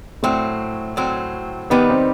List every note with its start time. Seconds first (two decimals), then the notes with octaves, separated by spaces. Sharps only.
0.23 A2 F#3 A3 C4
0.97 A2 F#3 C4
1.70 D#3 G3 B3 D#4 G4 B4
1.90 C4